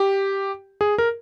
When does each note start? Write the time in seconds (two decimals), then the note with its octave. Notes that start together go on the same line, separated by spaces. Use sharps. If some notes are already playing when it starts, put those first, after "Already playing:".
Already playing: G4
0.81 G#4
0.98 A#4